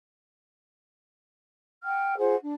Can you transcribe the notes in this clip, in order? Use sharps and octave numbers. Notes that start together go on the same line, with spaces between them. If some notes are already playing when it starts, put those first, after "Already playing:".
F#5 G5 F6
F4 G#4 C5 F#5
D4